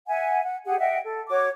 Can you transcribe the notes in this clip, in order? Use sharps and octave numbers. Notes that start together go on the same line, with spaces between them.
E5 F#5 G#5
F#5
G4 G#4 F#5
D#5 E5 F#5 G5
A4
F#4 C#5 D6